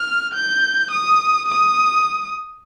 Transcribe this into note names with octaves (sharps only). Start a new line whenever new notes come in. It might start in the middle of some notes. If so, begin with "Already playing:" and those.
Already playing: F6
G6
D#6
D#6